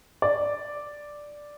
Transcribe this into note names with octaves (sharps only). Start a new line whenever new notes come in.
D5